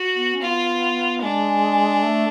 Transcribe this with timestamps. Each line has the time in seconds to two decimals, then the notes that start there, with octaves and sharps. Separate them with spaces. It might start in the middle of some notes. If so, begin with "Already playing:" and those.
Already playing: F#4
0.15 B3
0.34 C#4
0.42 B3 F4
1.22 G#3 D4
2.03 A3